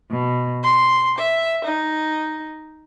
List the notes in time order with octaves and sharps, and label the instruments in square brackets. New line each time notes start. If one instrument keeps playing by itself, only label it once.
[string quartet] B2
C6
E5
D#4